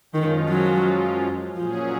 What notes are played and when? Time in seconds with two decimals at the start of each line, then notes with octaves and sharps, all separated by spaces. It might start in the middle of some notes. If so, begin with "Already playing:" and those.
0.14 F#2 D#3 F3 G#3 C#4 F4
0.49 F#3
1.56 A#2 F3 F#3 C#4 G#4